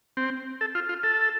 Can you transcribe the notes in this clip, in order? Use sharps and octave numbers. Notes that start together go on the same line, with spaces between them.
C4
A4
F4
F4
A4